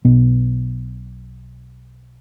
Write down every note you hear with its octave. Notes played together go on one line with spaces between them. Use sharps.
B1 B2 B3